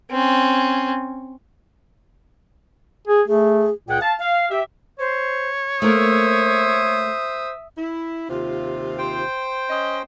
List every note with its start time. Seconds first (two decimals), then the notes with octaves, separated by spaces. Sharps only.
0.11 C4 C#4
3.07 G#4
3.28 A3 G#4
3.88 C#2 A#2 G#4 F#5 G5
4.01 F5 A5
4.19 F5
4.51 G4 E5
4.99 C5 C#5
5.82 A3 A#3 A#4 C5 E5 D#6
7.78 E4
8.29 D#2 C3 F4
8.98 C5 G5
9.70 C#4 D#5